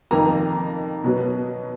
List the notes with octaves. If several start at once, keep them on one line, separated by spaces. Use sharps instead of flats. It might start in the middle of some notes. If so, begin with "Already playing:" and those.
F2 D#3 A#3 A#4 A#5
B2 F#3 B3